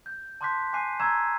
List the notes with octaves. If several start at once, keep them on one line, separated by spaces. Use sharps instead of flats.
G6
A5 C6 D6 F#6 G6 B6
G#5 D6 F#6 C7 D#7
A#5 C#6 D6 E6 G#6 E7